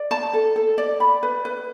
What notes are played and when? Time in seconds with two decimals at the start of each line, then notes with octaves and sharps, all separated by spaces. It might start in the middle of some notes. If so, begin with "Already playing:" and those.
Already playing: D5
0.11 A5
0.33 A4
0.56 A4
0.78 D5
1.00 B5
1.23 B4
1.45 B4